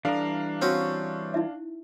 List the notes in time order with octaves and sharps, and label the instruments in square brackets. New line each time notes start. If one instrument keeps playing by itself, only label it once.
[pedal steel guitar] E3 G3 A#5 [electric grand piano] D4 F5 [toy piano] A4
[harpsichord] C4 C#4 F#4
[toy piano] D#4 E4 E5